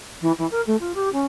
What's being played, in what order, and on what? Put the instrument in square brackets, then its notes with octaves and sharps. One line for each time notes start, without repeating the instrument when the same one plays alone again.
[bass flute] E3
E3
A#4
A3
F4
G4
C#4